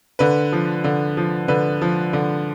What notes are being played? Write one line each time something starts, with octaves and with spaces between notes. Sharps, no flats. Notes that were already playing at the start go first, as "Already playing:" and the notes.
D3 B4
F3
D3
F3
D3 B4
F3
D3